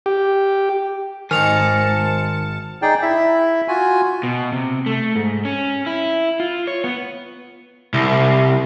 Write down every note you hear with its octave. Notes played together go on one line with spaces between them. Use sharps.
G4
G#1 D#3 C5 G#5 A5 F6 C#7 F7
D#4 G#4 D5 G5
E4 E5
F4 F#4 G#5
B2
C3
A3
G#2
C#4
E4
F4
C#5
B3
C2